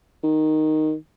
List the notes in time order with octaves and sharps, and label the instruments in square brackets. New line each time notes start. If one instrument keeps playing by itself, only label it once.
[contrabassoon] D#3